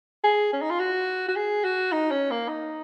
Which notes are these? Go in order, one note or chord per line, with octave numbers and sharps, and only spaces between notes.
G#4
C#4
D#4
F4
F#4
F#4
G#4
F#4
D#4
C#4
A#3
D#4